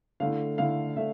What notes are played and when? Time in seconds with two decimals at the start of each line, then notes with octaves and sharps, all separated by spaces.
0.20 D3 A3 E4 F5
0.58 D3 A3 E4 F5
0.96 D3 A3 E5